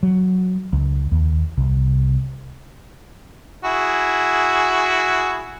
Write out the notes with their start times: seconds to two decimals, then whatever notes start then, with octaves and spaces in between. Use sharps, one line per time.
0.03 F#3
0.73 C#2
1.12 D#2
1.58 C2
3.64 E4 F#4 G#4